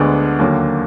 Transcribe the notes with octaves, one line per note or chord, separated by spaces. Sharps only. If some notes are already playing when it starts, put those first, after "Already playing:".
Already playing: D2 D3 G#3 B3 D4
D#2 D3 F#3 A#3